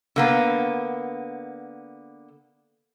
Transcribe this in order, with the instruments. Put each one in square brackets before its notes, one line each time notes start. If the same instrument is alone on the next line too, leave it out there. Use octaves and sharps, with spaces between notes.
[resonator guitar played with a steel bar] D3 A#3 B3